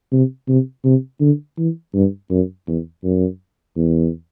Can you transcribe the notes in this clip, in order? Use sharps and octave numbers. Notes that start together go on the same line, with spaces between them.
C3
C3
C3
D3
E3
G2
F#2
E2
F#2
E2